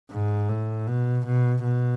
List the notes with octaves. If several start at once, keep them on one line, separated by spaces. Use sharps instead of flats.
G#2
A2
B2
B2
B2